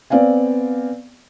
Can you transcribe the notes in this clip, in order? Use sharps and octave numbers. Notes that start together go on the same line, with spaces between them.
B3 C4 D5 F5 G#5